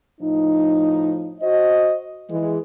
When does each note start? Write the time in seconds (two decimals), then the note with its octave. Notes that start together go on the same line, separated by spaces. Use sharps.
0.21 A2 F3 D#4
1.41 F#4 C5 D#5
2.30 E3 G#3